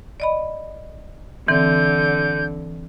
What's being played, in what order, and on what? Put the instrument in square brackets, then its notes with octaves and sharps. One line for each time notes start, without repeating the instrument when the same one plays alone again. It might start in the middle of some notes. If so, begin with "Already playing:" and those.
[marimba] D5 D#5 B5
[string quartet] D3 [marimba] E3 C4 [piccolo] G6